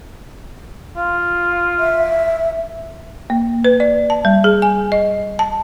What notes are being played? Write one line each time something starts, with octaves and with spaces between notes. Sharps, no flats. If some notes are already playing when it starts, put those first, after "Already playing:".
F4
E5
A#3
B4
D5
A5
G3
G#4
G#5
D#5
A5